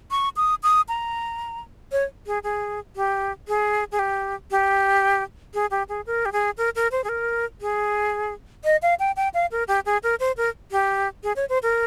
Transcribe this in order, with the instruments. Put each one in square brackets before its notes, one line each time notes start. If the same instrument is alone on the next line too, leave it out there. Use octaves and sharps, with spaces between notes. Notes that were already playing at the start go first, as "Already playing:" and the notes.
[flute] C#6
D#6
D#6
A#5
C#5
G#4
G#4
G4
G#4
G#4
G4
G4
G#4
G4
G#4
A#4
G4
G#4
A#4
A#4
C5
G#4
A#4
G#4
D#5
F5
G5
G5
F5
A#4
G4
G#4
A#4
C5
A#4
G4
G#4
C#5
C5
A#4